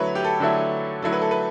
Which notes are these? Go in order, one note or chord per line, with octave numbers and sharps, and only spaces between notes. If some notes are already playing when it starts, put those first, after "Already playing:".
Already playing: D3 F#3 A3 E4 B4 C#5
G4
A4
D3 F#3 A3 E4
D3 F#3 A3 E4 A4
B4
A4
B4